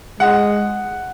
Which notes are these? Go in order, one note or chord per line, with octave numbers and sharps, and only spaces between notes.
G#3 F#5